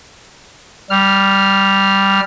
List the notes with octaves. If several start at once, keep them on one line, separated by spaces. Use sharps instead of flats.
G3 F6